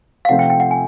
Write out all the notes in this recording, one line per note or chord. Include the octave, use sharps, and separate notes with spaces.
F5
C3 F3 A3 C4 F#5
G5
G5
F#5
G#5